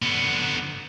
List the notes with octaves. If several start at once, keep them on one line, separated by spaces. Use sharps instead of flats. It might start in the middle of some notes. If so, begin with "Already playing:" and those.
D3 B3